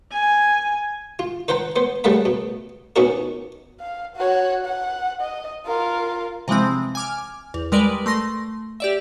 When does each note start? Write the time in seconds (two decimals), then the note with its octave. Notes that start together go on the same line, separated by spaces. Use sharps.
0.12 G#5
1.19 F4
1.48 B4 C5 F#5 G5 A#5
1.76 B3 C5
2.04 C#3 G3 A3 A#3 F#5 B5
2.25 B2
2.96 B2 B3 C#4 D#4 F#4 A#4
3.80 F5
4.16 F#4 C#5
4.65 F#5
5.21 D#5
5.65 F4 A#4
6.48 C3 E3 F3 G#3 C4
6.95 G#5 D6 F6
7.54 E2
7.72 G3 G#3 A#4 B4 D5
8.06 A3 C6 A#6
8.80 G4 D5 E5